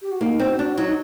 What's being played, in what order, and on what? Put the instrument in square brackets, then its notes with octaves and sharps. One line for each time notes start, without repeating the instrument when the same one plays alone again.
[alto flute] G4
F#4
[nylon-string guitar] A#3 [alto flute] D#4
[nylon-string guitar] C4
[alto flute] F#4
[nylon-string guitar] D4
[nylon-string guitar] F#3 [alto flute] D#4
[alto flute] D#4